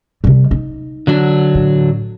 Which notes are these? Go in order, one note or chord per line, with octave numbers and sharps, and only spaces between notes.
C3 G3
D#4
D3 F#3 D4
A2